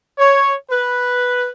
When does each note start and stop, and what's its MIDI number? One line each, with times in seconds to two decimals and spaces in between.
0.18 0.53 73
0.69 1.48 71